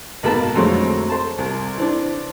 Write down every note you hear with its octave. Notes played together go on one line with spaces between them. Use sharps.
G#1 B2 A#3 B4 A5
F2 D3 F#3 G#3 A3 C4
C5 A5
C2
E3 C4 D4